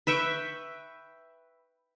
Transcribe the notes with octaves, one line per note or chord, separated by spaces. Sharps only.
B4 E5 G5 C#6